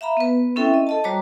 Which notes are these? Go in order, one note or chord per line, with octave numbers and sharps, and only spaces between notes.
E5 F5 A#5 B5
B3 B4
C4 C#4 E4 A4 E5 G5
D#5
A4 D#5 A5
G3 F#4 C5 C#5 A#5 D6